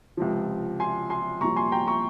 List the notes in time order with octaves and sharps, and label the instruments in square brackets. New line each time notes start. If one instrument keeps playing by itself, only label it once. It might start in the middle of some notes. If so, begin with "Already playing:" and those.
[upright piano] C#2 C3 F3
G#5 C6
G#5 C6
C2 A#2 F3 A#5 C#6
G#5 C6
G5 A#5
A#5 C#6